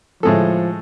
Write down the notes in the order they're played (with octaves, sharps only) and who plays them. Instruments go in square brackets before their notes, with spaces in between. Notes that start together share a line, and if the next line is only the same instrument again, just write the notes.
[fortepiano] A2 G#3 A4 [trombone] F3